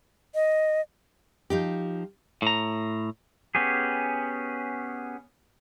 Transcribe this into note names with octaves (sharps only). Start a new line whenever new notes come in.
D#5
F3 D#4 G4
A2 A#5
B3 C#4 G4 G#4